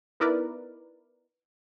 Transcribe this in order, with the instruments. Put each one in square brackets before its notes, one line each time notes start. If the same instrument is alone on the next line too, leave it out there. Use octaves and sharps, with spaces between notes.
[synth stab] B3 D#4 E4 A#4 B4 D5